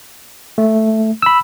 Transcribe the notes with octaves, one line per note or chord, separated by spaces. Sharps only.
A3
B5 E6